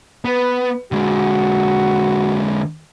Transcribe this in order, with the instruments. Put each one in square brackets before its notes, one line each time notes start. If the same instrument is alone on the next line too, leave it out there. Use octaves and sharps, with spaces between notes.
[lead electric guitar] B3 [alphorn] B4
[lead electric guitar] D3 G#3 [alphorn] F#4